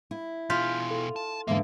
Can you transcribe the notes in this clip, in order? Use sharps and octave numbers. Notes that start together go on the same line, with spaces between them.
E4
B2 F4 G#4 F6 G6 B6
A4
A5
E2 G#2 D3 A#3 E5 F5